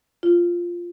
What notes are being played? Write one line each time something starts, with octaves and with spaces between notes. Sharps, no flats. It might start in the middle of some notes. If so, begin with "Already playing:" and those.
F4